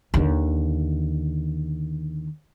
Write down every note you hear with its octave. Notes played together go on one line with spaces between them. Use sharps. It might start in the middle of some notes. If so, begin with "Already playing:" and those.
D#2 D3